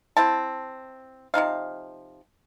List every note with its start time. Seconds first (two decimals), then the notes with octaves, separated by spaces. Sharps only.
0.17 C4 E4 A5
1.34 C3 F3 D#4 F5